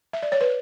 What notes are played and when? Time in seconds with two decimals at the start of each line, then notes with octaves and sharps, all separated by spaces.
0.13 E5
0.23 D5
0.32 C#5
0.41 B4